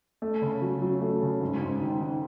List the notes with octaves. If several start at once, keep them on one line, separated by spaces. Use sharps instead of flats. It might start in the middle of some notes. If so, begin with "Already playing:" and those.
A3
C#3
F#3
F#3
A3
C#3
G#2
G#2
D#3
D#3